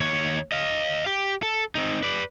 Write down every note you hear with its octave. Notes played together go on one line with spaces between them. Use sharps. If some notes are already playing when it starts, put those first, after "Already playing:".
D#2 C#5
D#5 F5
G4
A4
C4 D#4
B4 D5